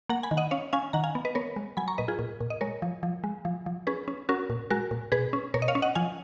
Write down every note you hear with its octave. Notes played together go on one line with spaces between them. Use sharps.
A#3 F#5 A#5
G#5 B5
D#3
D#5 F#5
C#4 C#5 F5
C#4 F5 G#5
D#3 F#5 A#5
F5 G#5
B3
B4 D#5
B3 A#4 C#5
G#3
F#3 G#5 B5
A#5 C#6
A#2 B4 D#5
F4 G#4
A#2
A#2
D#5
G#3 A#4 C#5
F3
F3
G#3
F3
F3
C#4 G#4 B4
C#4
C#4 F#4 A#4
A#2
G#3 F#4 A#4
A#2
B2 G#4 B4
C#4
B2 A#4 C#5
D#5
C#5 F5
C#4
D#5 F#5
F3 F5 G#5